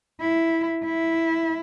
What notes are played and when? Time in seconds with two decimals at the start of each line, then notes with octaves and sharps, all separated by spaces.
0.20 E4
0.85 E4